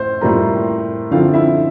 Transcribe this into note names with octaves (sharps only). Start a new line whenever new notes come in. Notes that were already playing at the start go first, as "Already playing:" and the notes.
Already playing: A2 C5 C6
A2 G3 A#3 F4 A#4 A#5
D3 F3 C4 E4 F4 F5
E4 E5